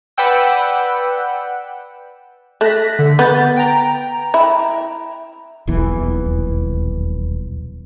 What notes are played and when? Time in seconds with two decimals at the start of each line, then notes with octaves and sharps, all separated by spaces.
0.18 B4 D5 F#5 G5 E6
2.61 A3 F#6 A#6 B6
2.99 D3
3.19 B3 G6 A6
3.56 G5 A#5
4.34 E4
5.67 D#1 B1 E2 E3